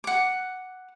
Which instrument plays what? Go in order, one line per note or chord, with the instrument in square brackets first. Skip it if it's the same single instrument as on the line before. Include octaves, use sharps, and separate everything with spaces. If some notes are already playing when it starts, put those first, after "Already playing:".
[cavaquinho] F#5 D6